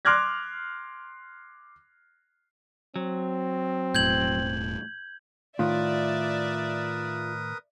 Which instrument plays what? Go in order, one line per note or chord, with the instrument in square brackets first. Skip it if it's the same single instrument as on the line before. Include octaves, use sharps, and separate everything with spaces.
[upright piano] C6 D6 F6 F#6 G#6 A#6
[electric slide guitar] F#3 [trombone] C4
[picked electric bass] E1 A2 [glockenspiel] G6 G#6 F#7
[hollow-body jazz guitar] A2 D#3 [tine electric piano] F4 [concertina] A#4 B4 D#6 [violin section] D5 E5